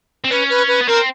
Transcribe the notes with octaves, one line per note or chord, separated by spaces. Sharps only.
C4
C#4 B4
B4
B4
B3
C4 A#4